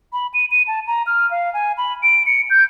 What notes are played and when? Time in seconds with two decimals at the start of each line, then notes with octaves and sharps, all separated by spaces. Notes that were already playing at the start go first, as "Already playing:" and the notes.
0.13 B5
0.34 D#7
0.51 D#7
0.67 A5
0.87 A#5
1.07 F6
1.31 F5
1.54 G#5
1.78 B5
2.03 D7
2.26 C#7
2.50 G6